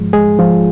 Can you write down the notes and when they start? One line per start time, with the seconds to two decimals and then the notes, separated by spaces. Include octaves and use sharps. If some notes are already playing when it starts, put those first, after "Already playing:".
Already playing: G#2 F3 G#3
0.13 G#3 G#4
0.39 F3 F4